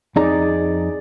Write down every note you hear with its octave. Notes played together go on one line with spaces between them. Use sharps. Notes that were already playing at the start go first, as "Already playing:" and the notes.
F2 C4 D#4 G#4 D5 A#5